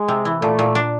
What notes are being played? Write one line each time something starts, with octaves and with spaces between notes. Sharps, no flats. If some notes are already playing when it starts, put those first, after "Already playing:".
Already playing: G#3
C3
E3
A#2 A3
A#2
D4